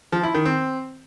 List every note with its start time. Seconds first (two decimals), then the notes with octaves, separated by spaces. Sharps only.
0.12 F3
0.23 E4
0.34 D#3
0.45 C4